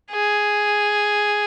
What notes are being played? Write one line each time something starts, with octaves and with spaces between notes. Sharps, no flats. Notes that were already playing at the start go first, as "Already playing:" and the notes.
G#4